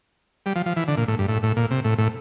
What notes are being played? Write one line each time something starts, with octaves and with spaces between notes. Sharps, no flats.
G3
F3
F3
E3
D3
A#2
A2
G2
A2
A2
A#2
C3
A2
A2